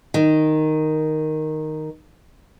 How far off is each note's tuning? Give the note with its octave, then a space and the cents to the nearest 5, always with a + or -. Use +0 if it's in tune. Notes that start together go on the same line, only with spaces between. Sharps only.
D#3 -5